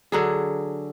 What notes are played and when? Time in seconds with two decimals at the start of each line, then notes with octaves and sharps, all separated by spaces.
0.12 D3 F#3 G#4